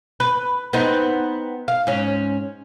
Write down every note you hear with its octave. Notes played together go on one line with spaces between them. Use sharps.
B4
B3 C4 D#4
F5
G#2 C#4